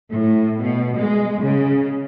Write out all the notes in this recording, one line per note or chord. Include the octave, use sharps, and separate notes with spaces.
A2
B2
G#3
C#3